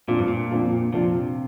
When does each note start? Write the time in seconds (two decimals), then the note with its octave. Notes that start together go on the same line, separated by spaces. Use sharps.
0.08 F2 A#2 F3 D4 F4
0.18 G2
0.28 A#2
0.50 F2 F3 D4 F4
0.92 F2 C3 F3 D4 F4